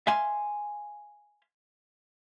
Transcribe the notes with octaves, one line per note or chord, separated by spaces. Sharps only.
E5 F5 G#5 C6